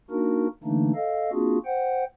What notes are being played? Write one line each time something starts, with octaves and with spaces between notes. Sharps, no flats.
A#3 D4 D#4 F#4 A#4
D3 E3 A3 A#3 D4 D#4
A4 D#5 F5
A#3 C4 D4 F4 F#4 G#4
C5 F#5 G5